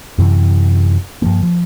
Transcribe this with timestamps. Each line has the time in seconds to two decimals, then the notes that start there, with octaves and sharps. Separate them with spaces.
0.18 F#2 C3 E3
1.22 G2 F3 A#3
1.43 F3